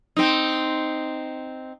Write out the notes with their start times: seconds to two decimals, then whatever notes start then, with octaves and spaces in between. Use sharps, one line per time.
0.17 C4 D#4